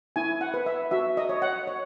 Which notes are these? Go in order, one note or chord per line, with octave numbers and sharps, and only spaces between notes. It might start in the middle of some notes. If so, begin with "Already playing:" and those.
E4 G#5
F#5
B4
E5
F#4 E5
D#5
C#5
F#5
C#5